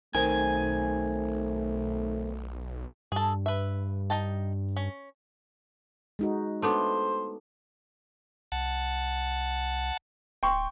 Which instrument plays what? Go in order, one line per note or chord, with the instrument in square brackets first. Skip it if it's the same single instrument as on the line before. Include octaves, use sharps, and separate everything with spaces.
[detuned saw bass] B1 [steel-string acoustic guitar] D#3 C4 [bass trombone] A3 [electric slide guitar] G#5
[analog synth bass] G2 [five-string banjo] G#4 A4
[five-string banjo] B4 E5
D#4 G5 A5
C#4
[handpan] G#3 D#4 F#4
[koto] A3 B3 D4 [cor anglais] C5
[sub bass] C2 [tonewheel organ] F#5 A5
[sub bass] D1 [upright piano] G5 C6 C#6